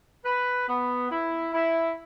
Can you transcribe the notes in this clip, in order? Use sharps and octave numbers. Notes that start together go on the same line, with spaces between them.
B4
B3
E4
E4